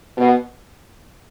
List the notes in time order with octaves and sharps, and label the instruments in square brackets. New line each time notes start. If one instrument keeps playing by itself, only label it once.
[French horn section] B2